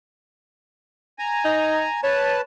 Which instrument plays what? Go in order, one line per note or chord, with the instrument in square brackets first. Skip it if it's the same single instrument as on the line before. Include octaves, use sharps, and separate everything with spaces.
[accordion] G#5 A#5
[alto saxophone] D#4
[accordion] B4 A5 [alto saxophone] C#5